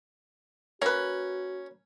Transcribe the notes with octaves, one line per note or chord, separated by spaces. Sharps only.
A#3 C#4 F#4 B4